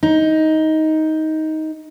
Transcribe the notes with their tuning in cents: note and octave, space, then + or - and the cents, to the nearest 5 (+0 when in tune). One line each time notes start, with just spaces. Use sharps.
D#4 +15